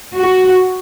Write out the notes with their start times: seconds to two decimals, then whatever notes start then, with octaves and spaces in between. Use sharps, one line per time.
0.17 F#4